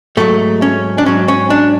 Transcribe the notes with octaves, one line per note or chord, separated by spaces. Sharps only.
G#2 F#3 A3
C#4
D4
G#2 F#3 C#4
C#4
D4